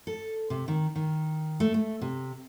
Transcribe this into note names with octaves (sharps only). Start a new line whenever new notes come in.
A4
C3
D#3
D#3
A3
A3
C3